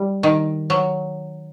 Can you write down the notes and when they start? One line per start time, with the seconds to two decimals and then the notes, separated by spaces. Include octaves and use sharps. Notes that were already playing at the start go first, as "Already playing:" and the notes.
Already playing: G3
0.23 D#3
0.70 F#3